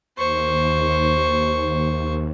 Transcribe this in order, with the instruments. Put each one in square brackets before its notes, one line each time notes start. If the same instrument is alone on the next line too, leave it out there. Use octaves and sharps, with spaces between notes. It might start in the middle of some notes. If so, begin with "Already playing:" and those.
[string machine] D#2 [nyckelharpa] C5 C#6